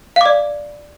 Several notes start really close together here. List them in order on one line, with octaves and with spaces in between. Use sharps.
F5 D6 D5